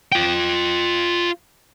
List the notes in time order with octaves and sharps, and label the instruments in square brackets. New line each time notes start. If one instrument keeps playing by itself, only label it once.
[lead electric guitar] F4 G5